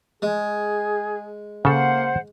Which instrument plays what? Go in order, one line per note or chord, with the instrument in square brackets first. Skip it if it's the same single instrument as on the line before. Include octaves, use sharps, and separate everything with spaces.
[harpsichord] G#3 [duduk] G#4
[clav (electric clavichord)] C#3 A4 [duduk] A#3 [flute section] C5 F#5